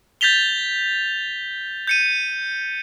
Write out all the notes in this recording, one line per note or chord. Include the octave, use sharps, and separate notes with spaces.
G6 A6 B6 F7 G7
G6 C#7 D#7